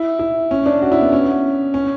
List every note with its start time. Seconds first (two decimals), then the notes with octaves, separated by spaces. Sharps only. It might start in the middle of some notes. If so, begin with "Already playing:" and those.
Already playing: E4
0.19 E4
0.51 C#4
0.66 D4
0.82 F#4
0.92 E4
1.01 B3
1.13 C#4
1.74 C#4